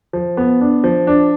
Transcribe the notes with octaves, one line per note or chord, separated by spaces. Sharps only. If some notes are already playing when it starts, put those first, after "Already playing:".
F3
B3
D4
F3
D4